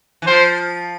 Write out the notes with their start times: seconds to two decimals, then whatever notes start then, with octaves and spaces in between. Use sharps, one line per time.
0.22 E3
0.27 F3 C5